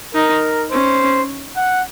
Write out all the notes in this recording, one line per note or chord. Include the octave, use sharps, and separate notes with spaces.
D#4 A#4
C#4 C5
F#5